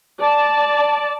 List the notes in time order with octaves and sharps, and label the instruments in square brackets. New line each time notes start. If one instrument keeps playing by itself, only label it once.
[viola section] D5 A5